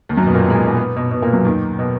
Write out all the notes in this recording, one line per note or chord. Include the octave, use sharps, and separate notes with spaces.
D#2 D#3
F#2 F#3
B2 B3
A#2 A#3
B2 B3
G#3
A#2 A#3
B2 B3
B3
B2 B3
B2 B3
A#2 A#3
F#2 F#3
D#2 D#3
B2